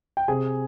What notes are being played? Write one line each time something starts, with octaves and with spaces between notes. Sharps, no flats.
G5
C3 G#4 G#5